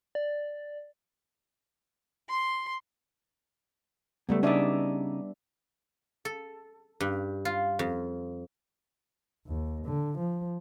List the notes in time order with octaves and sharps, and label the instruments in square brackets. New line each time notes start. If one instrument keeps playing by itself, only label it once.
[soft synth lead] D5
[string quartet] C6
[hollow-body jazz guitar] C#2 A3 [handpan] G3 B3
[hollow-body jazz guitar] C#3 D#4 [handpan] D4 D5 E5
[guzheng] A4
G2
F4
F2
[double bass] D#2
D3
F3